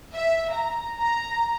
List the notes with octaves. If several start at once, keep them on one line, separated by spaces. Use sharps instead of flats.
E5
A#5
A#5